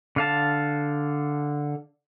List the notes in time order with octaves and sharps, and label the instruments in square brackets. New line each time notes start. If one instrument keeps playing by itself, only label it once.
[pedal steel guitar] D3 F5 A5